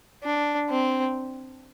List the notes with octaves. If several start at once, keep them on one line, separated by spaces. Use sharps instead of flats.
D4
C4